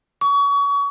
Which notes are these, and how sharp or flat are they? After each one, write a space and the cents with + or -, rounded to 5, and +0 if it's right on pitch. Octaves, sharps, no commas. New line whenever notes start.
C#6 +30